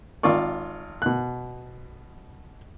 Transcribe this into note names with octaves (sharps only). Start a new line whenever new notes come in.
G#1 F4 D5 C#6
B2 F#6